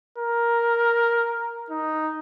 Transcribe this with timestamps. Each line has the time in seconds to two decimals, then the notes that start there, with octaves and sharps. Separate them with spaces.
0.18 A#4
1.70 D#4